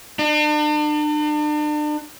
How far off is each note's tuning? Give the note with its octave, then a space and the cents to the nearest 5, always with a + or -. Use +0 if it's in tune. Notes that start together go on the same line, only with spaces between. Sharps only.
D4 +40